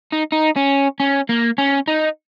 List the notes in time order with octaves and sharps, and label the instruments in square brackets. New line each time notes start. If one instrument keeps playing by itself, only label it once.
[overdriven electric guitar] D#4
D#4
C#4
C#4
A#3
C#4
D#4